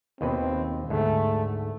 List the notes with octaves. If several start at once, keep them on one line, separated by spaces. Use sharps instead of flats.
D#2 B2 C4 B4
D2 G#2 A3